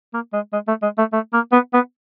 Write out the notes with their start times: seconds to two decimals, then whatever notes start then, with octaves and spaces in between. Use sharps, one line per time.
0.14 A#3
0.33 G#3
0.53 G#3
0.68 A3
0.82 G#3
0.98 A3
1.13 A3
1.33 A#3
1.52 B3
1.73 B3